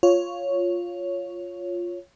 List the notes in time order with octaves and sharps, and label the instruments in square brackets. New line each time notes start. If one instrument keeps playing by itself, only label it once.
[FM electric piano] F4 C#5